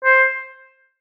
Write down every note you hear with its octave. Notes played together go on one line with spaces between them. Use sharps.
C5